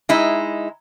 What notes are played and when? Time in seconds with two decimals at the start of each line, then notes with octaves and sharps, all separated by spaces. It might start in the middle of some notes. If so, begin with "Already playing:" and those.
0.09 G#3 D#4 E4